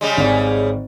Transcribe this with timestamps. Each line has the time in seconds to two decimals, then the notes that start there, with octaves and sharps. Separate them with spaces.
0.01 C#3 G3 G#3
0.17 G#1 D5